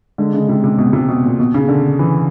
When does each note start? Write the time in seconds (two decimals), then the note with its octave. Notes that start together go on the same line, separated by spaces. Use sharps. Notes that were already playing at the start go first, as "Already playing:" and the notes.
0.18 D3 G#3
0.33 C#3
0.49 C3
0.64 C3
0.78 B2
0.93 C3
1.08 B2
1.24 A#2
1.39 B2
1.54 C#3
1.68 D3
1.99 E3